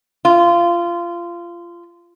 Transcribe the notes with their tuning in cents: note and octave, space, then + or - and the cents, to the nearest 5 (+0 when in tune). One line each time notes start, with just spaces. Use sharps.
F4 -20